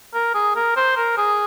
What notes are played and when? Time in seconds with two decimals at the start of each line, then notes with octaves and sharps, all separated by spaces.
0.13 A#4
0.34 G#4
0.55 A#4
0.76 C5
0.96 A#4
1.17 G#4